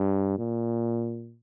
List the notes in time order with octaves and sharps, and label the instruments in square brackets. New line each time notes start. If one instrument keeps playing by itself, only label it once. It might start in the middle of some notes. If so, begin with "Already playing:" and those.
Already playing: [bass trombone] G2
A#2